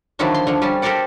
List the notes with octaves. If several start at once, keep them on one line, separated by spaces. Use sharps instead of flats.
D3 D#3 F3 F#3 D4 E4
C6
D3 F3
G3 C#4 A5
G4 A4 A#4 C5 D5 F#5